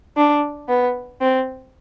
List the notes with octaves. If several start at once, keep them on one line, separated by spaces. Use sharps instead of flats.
D4
B3
C4